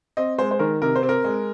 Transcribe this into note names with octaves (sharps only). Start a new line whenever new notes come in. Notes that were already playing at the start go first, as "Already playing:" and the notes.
C4 D#5
G#3 C5
C5
D#3 A#4
C3 A#4
C5
C4
A#4
G#3